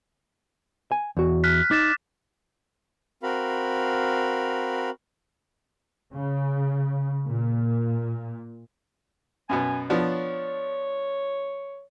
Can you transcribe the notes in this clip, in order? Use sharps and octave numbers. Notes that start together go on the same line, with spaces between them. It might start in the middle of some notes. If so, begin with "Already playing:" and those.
G#5
E2 F#4
F6 F#6 B6
D#4 D6 A6 E7
C4 F#4 A#4 F5 B5
C#3
A#2
F#2 B2 B3 G#5
F3 B3 D4 C#5